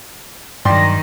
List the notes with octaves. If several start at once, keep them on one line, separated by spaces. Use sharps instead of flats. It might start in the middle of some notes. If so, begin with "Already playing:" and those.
G2 D#3 F#3 D5 G5 C6